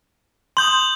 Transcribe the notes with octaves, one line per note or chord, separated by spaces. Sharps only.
C6 D#6 G6 F#7